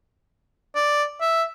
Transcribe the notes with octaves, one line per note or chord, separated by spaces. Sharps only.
D5
E5